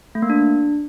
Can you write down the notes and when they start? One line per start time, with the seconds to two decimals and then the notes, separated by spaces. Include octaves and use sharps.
0.15 A3
0.22 A#3
0.30 D4